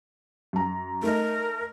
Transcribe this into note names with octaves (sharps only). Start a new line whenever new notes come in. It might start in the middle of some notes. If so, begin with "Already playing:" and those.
F#2 A#5
A3 D#4 A#4 D#5